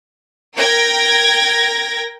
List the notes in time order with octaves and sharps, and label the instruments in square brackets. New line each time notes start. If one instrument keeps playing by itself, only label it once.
[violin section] A#4 G5 G#6 A#6